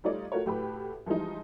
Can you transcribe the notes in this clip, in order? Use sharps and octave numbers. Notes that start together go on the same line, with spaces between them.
G3 A3 D#4 F4 C#5 D5
A3 F4 F#4 A#4 C#5
A2 F#4 G4 A4 B4 B5
E3 F3 G3 G#3 D#4